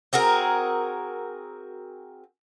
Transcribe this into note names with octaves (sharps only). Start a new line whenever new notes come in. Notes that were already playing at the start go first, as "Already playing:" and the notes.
C4 F#4 G#4 A#4